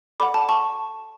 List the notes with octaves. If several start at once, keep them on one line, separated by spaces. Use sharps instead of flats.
A4 D5 F#5 B5 D6
A5
A5 C#6